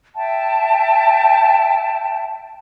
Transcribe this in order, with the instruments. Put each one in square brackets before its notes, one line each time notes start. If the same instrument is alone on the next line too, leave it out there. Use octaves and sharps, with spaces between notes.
[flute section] E5 G5 A5